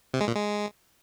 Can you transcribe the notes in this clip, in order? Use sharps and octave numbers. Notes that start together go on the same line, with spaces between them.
C3
G#3
A#2
G#3